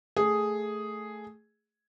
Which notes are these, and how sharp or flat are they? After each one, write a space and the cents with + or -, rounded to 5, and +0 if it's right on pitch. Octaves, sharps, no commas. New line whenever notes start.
A3 +0 G#4 +0